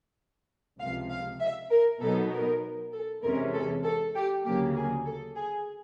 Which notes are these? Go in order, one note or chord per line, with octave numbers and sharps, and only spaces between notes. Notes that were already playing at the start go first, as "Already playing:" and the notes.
C#2 C3 F3 F5
F5
E5
A#4
B2 F#3 B3 D#4 A4
A#4
A4
E2 C3 E3 G#3 C#4 A#4
A4
A4
G4
D2 C#3 F#3 A#3 G4
G#4
A4
G#4